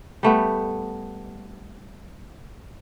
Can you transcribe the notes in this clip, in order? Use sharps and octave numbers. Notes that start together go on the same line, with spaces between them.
G3 A3 B3